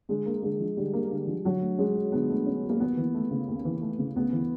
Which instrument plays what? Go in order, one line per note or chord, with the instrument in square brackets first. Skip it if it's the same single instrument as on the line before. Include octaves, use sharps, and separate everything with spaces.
[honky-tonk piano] D3 [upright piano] G#3
[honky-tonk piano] A#3
[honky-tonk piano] D3 [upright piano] G#3
[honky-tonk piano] F3
[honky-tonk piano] D3 [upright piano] G3
[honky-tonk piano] A#3
D3
F3
[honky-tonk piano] D3 [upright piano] F#3
[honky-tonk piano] A3
[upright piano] G#3 [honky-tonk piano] C#4
[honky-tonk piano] F#3
[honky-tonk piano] D3 [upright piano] B3
[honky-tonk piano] A3
C#4
F#3
[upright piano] A#3
[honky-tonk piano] D#2 [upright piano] B3
[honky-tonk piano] E3
A3
C#3
D#2
E3
A3
C#3
[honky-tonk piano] D2 [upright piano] B3
[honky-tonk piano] E3